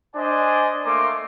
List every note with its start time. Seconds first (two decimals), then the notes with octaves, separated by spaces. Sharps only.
0.16 D4 C5 D5 D#5 G#5
0.85 A3 A#3 A#4 E5 C6 D6